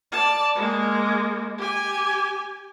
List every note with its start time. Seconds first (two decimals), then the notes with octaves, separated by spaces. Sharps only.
0.12 D5 A5
0.55 G#3 A#3
1.58 G4 G#5